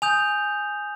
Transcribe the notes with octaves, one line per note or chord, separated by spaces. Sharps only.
G#5 D#6 G6 F7